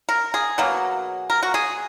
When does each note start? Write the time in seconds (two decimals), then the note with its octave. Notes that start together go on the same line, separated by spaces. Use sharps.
0.09 A#4
0.34 G#4
0.58 B2 F#3 A#3
1.30 A#4
1.43 F#4
1.54 G#4